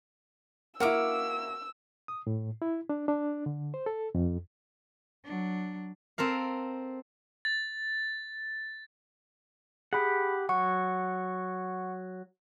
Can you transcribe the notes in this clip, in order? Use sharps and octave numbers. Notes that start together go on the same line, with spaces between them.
A#3 E4 F#4 F5 D6 E6
D#6
A2
E4
D4
D4
D3
C5
A4
F2
F#3 D4
C4 A4 A#4 F5
A6
G4 G#4 F#5 B5
F#3 F#5 C#6